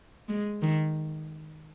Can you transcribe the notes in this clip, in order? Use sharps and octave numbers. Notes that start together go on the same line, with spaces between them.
G#3
D#3